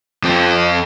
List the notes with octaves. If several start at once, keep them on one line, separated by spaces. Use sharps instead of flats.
F2 C4